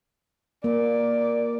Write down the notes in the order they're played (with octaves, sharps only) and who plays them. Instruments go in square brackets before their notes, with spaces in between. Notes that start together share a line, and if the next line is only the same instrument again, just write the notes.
[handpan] A#3 [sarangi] D5